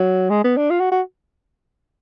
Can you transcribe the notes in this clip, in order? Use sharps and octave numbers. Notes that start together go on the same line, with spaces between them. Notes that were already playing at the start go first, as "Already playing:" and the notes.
Already playing: F#3
G#3
B3
D4
F4
F#4
F#4